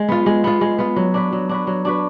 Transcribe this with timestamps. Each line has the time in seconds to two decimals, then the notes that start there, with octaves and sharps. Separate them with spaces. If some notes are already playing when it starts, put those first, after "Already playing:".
Already playing: G#3
0.09 B3 F4
0.26 G#3
0.44 B3 F4
0.61 G#3
0.79 B3 F4
0.96 F#3
1.14 D4 F#4 B4
1.32 F#3
1.49 D4 F#4 B4
1.67 F#3
1.85 D4 F#4 B4